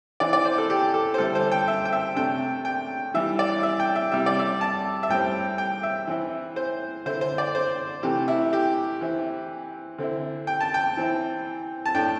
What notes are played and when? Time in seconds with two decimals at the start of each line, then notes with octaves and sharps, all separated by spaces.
0.20 E3 C4 E4 D5
0.33 D5
0.45 C5
0.58 A4
0.70 G4
0.94 A4
1.14 C5
1.18 D3 G3 E4 A4
1.35 C5
1.52 G5
1.68 E5
1.85 G5
1.93 E5
2.16 C3 A3 D4 G5
2.65 G5
3.14 E3 G3 E4 E5
3.39 D5
3.63 E5
3.80 G5
3.96 E5
4.12 C3 G3 E4 E5
4.26 D5
4.39 E5
4.61 A5
5.03 E5
5.09 A2 G3 C4 G5
5.58 G5
5.83 E5
6.07 E3 C4 E4
6.56 C5
7.06 D3 C4 E4 C5
7.21 C5
7.38 D5
7.55 C5
8.03 C3 E3 A3 G4
8.28 E4
8.53 G4
9.01 E3 C4 E4
9.99 D3 C4 E4
10.47 G5
10.61 A5
10.74 G5
10.97 E3 C4 E4
11.86 A5
11.95 A2 A3 D4 G5